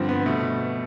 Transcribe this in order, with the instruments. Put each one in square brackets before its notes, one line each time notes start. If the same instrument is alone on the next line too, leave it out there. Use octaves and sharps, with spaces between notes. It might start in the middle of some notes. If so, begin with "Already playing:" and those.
Already playing: [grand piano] G2 D3 F3 C4
B3
B2 A3